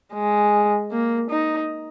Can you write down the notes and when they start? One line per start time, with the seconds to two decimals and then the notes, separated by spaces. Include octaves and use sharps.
0.14 G#3
0.91 A#3
1.30 D#4